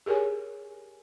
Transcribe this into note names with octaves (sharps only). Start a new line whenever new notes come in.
G4 G#4 A#4 C#5 G#5